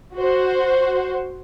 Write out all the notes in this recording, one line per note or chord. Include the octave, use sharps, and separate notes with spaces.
F#4 C5